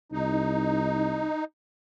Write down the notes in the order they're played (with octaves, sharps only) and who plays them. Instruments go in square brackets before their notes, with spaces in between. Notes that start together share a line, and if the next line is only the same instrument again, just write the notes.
[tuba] C2 [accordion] D#4